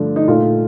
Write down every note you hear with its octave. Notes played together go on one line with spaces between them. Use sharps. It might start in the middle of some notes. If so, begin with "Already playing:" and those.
Already playing: G2 D3 F3 A3 D4
D#4
A#2 A3 F4